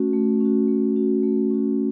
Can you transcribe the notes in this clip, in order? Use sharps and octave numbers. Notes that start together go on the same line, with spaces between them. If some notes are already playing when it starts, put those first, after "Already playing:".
Already playing: A3 C#4 F#4
A3
C#4
F#4
A3
C#4 F#4
A3
C#4 F#4